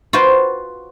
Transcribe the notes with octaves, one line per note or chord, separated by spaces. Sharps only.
F4 F#4 B4 C5 G5